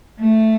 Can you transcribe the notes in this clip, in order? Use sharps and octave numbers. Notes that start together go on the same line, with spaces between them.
A3